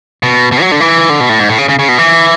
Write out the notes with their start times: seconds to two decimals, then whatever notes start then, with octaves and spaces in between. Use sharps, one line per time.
0.23 B2
0.52 B2
0.61 F#3
0.72 D3
0.80 E3
1.10 D3
1.20 B2
1.29 A2
1.39 G#2
1.49 A2
1.58 C#3
1.69 C#3
1.79 C#3
1.89 B2
1.98 E3